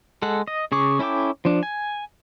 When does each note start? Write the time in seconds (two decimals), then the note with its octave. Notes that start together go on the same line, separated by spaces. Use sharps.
0.22 G#3 A4 F#5
0.48 D#5
0.72 C#3 G#4 C#6 D6
0.99 C#4 E4 A4 G5 D6
1.45 F3 D4
1.63 G#5